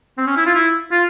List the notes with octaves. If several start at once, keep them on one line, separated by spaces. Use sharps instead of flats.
C4
C#4
E4
F4
E4
F4